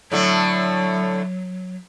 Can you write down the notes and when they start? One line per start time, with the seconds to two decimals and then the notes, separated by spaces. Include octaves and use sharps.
0.12 A2 D3 F#3 A3